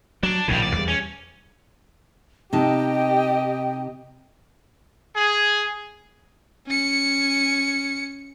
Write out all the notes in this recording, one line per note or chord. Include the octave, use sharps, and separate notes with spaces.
F#3 D4
A#1 D#2 A2 C#3 G3
D5
E2 G3
C#4
C3 D#4 G4 D#5 G5 A5
G#4
C#4 C#7